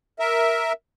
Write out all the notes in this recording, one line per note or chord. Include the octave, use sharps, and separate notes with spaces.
A#4 E5